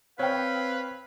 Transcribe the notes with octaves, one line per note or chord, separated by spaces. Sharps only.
C4 B4 C#5 F5 G5